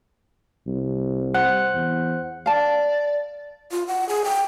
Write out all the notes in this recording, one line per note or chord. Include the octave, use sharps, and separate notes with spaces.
C2
C5 F#5 F#6
E2
D5 F5 A5
F4
F#5
G#4
G5